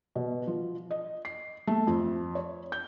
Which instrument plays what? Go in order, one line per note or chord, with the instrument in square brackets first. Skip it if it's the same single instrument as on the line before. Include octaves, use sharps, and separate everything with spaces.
[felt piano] B2
F3
D#5
C7
A3
F2
C#5
G6